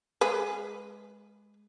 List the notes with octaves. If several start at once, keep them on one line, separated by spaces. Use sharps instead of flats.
G#3 G#4 B4